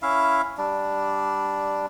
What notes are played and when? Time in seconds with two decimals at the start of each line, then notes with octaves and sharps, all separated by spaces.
0.02 C#4 E4 E5 F5
0.58 G3 D4